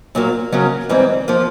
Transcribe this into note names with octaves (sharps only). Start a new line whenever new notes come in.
A#2 F#3 A#3
C#3 F#3 A#3 C#4
G#2 E3 G3 C4
F3 A#3